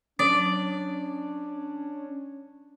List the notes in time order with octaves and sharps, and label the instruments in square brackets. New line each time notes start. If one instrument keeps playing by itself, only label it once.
[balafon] F#3 [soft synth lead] C#4 [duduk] D4 [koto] D5